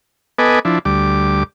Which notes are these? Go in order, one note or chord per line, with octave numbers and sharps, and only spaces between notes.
B3 A4 B4 D#5 G#5 D6
F3 D4 E4
D2 G3 D6